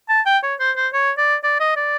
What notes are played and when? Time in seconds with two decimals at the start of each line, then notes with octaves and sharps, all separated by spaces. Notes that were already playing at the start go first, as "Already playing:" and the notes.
0.09 A5
0.26 G5
0.43 C#5
0.59 C5
0.76 C5
0.93 C#5
1.18 D5
1.44 D5
1.60 D#5
1.76 D5